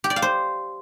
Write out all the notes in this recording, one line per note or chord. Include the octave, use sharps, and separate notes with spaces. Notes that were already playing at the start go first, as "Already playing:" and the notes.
G4
D5
F5
C5